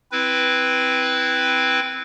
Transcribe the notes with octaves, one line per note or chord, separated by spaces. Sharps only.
C4 E4 B4